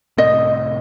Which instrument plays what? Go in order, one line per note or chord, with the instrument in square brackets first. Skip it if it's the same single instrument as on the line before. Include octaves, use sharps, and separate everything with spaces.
[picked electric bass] A2 C3 [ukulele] D#5